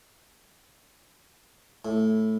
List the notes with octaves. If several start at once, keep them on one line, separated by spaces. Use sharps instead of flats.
A2